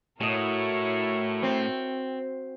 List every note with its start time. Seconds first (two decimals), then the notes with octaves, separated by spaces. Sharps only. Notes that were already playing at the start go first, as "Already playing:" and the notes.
0.21 A2 E4 F#4 A#4 C#5 D#5
1.43 C4